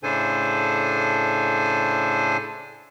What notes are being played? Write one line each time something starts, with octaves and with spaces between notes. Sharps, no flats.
A2 C#3 D4 A4 C5 G#5